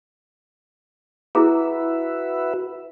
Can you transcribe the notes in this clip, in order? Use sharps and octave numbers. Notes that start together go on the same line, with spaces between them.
E4 F#4 G#4 B4 E5 A#5